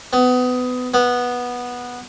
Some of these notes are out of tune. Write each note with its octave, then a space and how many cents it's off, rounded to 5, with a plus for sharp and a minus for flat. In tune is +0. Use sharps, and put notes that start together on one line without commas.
B3 +25
B3 -10